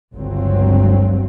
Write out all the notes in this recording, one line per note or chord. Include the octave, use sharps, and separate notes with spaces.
G1 C#2 G2 F#3 C4